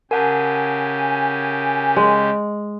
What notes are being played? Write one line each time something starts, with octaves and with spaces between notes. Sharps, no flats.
C#3 G4 A#4 F#5 G#5 A5
G#3